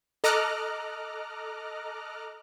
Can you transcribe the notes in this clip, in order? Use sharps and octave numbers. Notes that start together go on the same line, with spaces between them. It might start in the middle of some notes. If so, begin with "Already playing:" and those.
A4 D#5 A#5 D6 F6 F#6